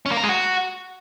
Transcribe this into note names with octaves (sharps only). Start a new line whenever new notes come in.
C#4
A#3
A#4
G#3
F#4